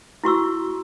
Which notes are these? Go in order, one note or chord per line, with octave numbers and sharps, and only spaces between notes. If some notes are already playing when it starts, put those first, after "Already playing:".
E4 F#4 C#6 E6